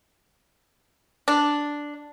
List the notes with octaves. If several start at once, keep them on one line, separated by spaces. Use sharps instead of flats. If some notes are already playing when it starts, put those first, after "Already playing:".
D4